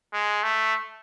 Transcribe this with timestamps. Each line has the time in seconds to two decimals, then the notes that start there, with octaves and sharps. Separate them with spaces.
0.13 G#3
0.43 A3